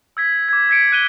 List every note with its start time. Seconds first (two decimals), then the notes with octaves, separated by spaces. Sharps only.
0.17 E6 G#6 B6
0.49 D6 G#6
0.69 E6 G#6 B6 C#7 D7
0.92 F#6 D#7 G7